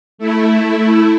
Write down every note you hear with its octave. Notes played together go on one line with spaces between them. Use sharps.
A3 E4